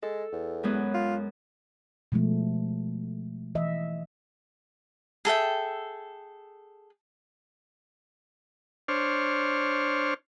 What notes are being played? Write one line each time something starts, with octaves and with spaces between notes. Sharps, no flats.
G#3 A4
E2
F#2 G#3 B3
F4
B2 F3 G#3 A3
E3 D#5 E5
G#4 A4 E5 G5
D4 C5 C#5 F6